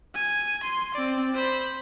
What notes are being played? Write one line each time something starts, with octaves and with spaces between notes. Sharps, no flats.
G#5
C6
C4 D5
C5 B5